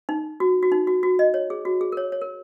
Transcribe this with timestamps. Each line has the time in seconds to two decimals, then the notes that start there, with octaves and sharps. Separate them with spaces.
0.09 D#4
0.40 F#4
0.63 F#4
0.72 D#4
0.87 F#4
1.03 F#4
1.19 D#5
1.34 C#5
1.50 G#4
1.65 F#4
1.81 G#4
1.92 A#4
1.97 C#5
2.12 C#5
2.21 A#4